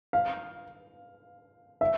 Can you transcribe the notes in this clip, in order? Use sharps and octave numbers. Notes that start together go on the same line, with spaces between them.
F5
E5